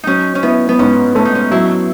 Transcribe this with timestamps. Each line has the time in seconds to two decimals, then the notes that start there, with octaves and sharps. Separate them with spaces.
0.04 F#3 C#4 D#4
0.35 C#4
0.43 B3 E4
0.69 B3
0.79 G#2 C#4
1.15 A3 C#4
1.25 D#4
1.35 C#4
1.51 F#3 E4